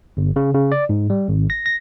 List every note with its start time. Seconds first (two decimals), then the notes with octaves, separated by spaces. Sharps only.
0.17 G1
0.36 C#3
0.54 C#3
0.72 D5
0.89 G#2
1.10 G3
1.28 G#1
1.50 A#6
1.66 A#6